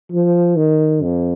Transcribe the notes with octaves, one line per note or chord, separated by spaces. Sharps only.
F3
D#3
F2